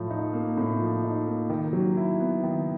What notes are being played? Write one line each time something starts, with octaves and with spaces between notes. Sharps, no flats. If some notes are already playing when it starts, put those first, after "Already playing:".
Already playing: A2 F3
D#4
A#3
A2
F3
D#4
A#3
D#3
F#3
E4
B3
D#3